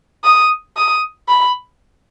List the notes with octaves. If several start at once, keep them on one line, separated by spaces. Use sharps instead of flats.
D#6
D#6
B5